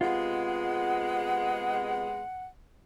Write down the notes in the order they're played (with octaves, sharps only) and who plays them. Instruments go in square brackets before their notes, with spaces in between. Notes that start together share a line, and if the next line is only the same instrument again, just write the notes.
[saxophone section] C3 G#3 [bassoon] B3 [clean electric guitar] F4 [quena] F#5